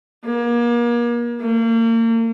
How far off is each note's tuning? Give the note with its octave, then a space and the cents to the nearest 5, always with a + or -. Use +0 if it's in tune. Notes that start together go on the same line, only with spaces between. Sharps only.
A#3 +35
A#3 -35